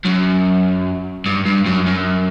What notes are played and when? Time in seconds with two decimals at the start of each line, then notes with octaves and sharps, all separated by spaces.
0.05 F#2
1.26 G2
1.46 G2
1.66 F#2
1.86 F#2